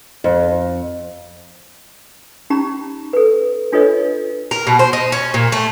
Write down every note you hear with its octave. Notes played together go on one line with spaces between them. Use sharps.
F2
C#4 D#4 G4 A#5 B5
A4 B4
D4 F4 A4 B4 C#5 D#5
A#4
B2
C5
D#4
C#4
A#2
A3